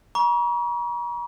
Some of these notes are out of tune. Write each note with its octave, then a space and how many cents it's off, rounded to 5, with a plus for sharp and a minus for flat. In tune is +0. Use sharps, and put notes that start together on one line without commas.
A#5 +40 C#6 +40